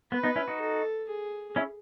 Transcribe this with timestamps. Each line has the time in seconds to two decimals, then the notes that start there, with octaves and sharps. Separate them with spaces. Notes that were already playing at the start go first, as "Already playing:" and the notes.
0.12 B3 B4
0.23 B3 D#4
0.36 C#4 E4
0.48 D#4 F#4
0.60 A4
1.08 G#4
1.56 C#4 E4